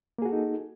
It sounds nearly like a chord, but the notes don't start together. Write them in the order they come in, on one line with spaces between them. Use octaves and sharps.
A#3 G#4 F#4 A4 D#4